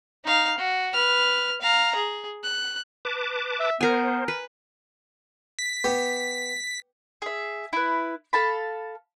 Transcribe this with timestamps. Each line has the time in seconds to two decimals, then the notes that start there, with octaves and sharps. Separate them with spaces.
0.24 D#4 F5
0.58 F#4
0.93 B4 F6
1.61 F5 A#5
1.95 G#4
2.43 F#6
3.05 B4 A5 D6
3.60 E5
3.81 B3 A#4 C5 G#5
4.28 B4
5.59 B6
5.84 B3 G4
7.22 G#4 E5
7.73 E4 B4
8.33 A4 F5 A5 B5